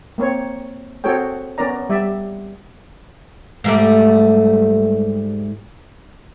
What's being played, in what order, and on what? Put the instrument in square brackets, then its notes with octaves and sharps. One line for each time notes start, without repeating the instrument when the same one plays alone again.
[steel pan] A#3 C4 C#5
C4 F#4 G#4 A4 C#5 G5
B3 C#4 A#4 D5 A#5
G3 D5 E5
[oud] G#2 G3 A3